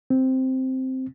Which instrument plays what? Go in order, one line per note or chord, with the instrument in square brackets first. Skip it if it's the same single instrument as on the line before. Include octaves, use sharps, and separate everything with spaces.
[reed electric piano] C4